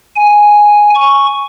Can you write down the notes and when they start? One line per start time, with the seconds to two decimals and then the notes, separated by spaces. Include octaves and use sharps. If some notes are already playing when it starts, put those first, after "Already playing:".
0.16 G#5
0.95 C#6